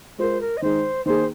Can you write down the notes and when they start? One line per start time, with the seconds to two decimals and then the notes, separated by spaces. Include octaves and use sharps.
0.18 G#3 F4 A#4 C5
0.40 A#4
0.57 D#5
0.62 D#3 G#3 D#4 C5
1.05 D#3 A#3 G#4 C5